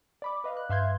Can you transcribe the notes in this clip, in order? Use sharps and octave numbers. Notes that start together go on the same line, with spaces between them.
D5 B5 D6
B4 D#5 F5
F#6
G2 E5 F5 C6 G6 G#6